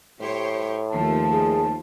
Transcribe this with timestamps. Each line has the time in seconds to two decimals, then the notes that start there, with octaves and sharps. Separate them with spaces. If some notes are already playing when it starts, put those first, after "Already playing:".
0.21 A2 G4 C5 C#5
0.92 D#2 F3 A3 A5
1.32 G#4